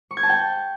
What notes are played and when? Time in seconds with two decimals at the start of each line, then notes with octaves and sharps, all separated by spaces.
0.11 C#6
0.17 G#6
0.23 A5
0.29 G5